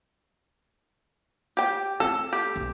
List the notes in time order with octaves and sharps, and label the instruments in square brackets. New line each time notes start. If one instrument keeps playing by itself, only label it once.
[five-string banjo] G4 G5
[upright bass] C4 [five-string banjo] A4
[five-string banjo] G4
[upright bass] B1